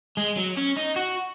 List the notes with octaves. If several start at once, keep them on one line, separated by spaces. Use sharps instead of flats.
G#3
F#3
C#4
D#4
F#4